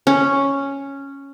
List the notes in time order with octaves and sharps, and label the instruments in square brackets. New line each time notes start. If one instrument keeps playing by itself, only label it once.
[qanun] C#4